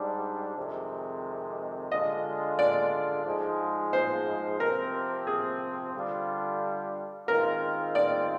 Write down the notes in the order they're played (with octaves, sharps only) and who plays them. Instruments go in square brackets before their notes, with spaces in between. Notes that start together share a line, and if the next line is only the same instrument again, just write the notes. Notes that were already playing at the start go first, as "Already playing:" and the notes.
Already playing: [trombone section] G#2 G3 D4
F2 C3 D#3 G#3
[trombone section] D3 G#3 D4 F4 [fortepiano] D#5
[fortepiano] D5
[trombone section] G#2 F3 G#3
[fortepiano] C5
[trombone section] C3 F3 C4 [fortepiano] A#4
[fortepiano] G#4
[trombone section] D3 G3 D4 F4
[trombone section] D#3 G#3 C4 F4 [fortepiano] A#4
[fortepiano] D5